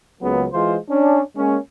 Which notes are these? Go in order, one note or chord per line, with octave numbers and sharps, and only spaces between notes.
C#2 C#3 F#3 A#3 B3
E3 G#3 F4 C5
C#4 D4
G#3 A#3 C#4